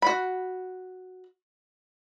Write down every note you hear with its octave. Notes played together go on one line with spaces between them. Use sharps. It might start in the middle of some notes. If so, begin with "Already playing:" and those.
F#4 B5